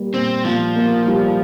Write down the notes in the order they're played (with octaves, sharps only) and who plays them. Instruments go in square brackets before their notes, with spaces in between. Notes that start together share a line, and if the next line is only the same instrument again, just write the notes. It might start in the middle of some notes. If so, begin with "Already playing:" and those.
Already playing: [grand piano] G3 A#3
[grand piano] A#2 [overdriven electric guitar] C4
[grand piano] A#2 [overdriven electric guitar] F3
[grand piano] A#3
G3